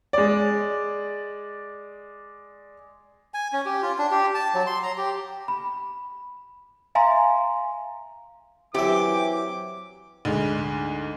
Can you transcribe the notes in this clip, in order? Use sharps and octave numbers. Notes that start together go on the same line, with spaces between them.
G#3 D5
G#5
C#4
G4
F4
D4
G4
A5
F#3
C6
A#5
G4
B5
E5 F5 G#5 A#5 C6
C3 E3 F#3 G4 E5 D6
D2 G#2 G#3